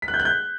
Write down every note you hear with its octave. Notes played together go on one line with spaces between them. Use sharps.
B6
F#6
G6
F#6
G6